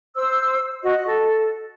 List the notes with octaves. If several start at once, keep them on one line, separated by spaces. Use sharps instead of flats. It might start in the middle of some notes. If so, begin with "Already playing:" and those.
C5 E6
F#4 D#5
A4